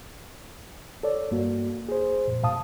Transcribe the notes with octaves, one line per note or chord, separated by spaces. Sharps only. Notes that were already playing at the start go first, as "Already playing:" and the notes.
A4 C#5 D5
G2 A#3 F#4
G#4 C5
F2 A#2
G#2 B2 F5 A5 D#6